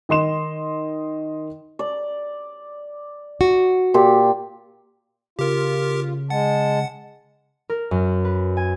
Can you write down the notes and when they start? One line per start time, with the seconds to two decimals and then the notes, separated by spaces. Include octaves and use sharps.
0.09 D#3 D#5 C6 E7
1.79 D5
3.41 F#4
3.94 A#2 F4 G4
5.39 C#3 F4 G4 A#4
6.30 G#3 F#5 A5
7.69 A#4
7.91 F#2
8.25 B4
8.57 G#5